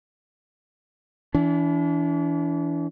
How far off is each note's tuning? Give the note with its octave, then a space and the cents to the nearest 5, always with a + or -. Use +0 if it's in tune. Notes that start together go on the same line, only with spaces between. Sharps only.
E3 +0 D4 -40